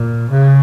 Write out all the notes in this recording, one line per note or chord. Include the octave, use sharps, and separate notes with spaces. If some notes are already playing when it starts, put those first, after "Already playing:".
Already playing: A#2
C#3